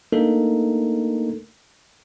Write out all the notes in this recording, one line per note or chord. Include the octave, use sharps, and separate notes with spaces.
A3 A#3 D4 D#4 A4 A#4